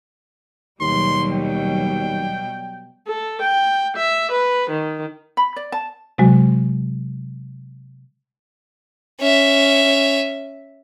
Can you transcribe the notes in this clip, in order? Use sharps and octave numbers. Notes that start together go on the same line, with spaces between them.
D#2 B2 F#3 G3 C6
G5
A4
G5
E5
B4
D#3
B5
D5
A5
C3 F#3 G#3 F#4
C#4 E5